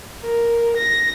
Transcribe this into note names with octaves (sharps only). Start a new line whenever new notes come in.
A#4
A#6